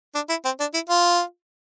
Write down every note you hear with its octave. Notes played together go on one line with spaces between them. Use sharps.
D4
E4
C4
D4
E4
F4